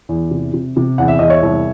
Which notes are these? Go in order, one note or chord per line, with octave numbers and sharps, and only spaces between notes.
E2
C3
C3
C3
E2 F#5
E5
E2 D#5
C#5 E5
C2